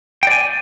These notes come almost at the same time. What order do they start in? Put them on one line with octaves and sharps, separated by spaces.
G5 D5 G#5